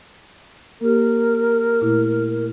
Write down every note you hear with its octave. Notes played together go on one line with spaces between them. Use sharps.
A#3 G4 A#4
A#2 A3 E4